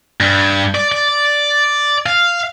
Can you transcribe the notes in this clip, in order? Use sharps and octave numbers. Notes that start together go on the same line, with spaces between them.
G2
D5
D5
F5